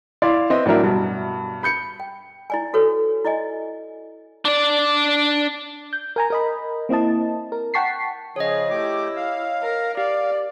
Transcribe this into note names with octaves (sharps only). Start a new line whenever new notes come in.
E4 D5 F5 C6
C4 B4 C5 D#5 E5
A2 F#3 D4 A#4 E5
G2 B2
B5 G6 C#7
G5
E4 D5 G#5
F#4 A4 B4 C#5
E4 D5 D#5 G#5
D4 D5
G6
A#4 G#5 A#5
A#4 D#5 B5
A#3 C4 E4 D#5 A5
A#4
F#5 G5 A5 C#6 B6 C7
C#3 F3 G#4 C#5 D#5
A3 E4 G4 D6
F5
A#4
G4 D5 F5